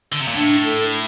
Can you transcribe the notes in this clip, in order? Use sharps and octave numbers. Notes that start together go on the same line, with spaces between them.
D3
C3
A#2
A2 D4
A4